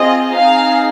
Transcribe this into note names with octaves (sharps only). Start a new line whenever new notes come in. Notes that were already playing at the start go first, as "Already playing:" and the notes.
Already playing: C4 F4 G#4 D#5
C4 D#4 G#4 F5